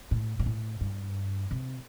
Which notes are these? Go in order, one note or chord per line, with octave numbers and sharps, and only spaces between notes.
A2
A#2
A2
G2
C3